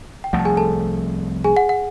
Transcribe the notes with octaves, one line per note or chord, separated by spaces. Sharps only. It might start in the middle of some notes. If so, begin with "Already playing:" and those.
G5
C2 C3 F3 A3 F#5
A5
G#4 G#5
A4 A5
G#4 G#5
F#5
F#5